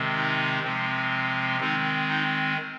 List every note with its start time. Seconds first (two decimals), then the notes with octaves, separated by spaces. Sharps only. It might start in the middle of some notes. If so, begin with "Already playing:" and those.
Already playing: C3 D#3 G#3 C4
0.15 D#4
0.63 C3 F3 G#3 C4
1.60 D#3 G#3 C4 D#4
2.09 D#4